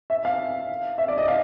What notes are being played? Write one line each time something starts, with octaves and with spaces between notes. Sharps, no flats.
E5
F5
E5
D5
D#5
F5